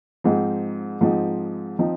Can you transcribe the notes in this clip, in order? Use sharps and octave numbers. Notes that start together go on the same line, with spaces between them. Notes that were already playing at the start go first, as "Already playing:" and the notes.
G#2 F3 C4 D#4
G#2 F3 C4 D#4
F3 C4 D#4